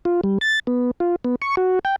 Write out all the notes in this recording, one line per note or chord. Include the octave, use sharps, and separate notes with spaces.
F4
G3
A6
B3
F4
B3
C#6
F#4
G5